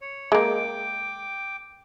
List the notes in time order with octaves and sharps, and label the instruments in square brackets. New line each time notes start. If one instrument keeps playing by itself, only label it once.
[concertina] C#5
[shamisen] G#3 A#3 [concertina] G5 D6